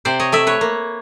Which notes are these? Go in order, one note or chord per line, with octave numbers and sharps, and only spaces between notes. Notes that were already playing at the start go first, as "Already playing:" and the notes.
C3 C5 D5
C#5 D#5
A3 D5 E5
B4 C#5
A#3